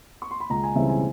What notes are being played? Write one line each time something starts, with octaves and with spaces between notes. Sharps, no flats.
C#6
C6
B5
C#2 A#5
G#5
C#3 E3 G3 C4 E5
G#5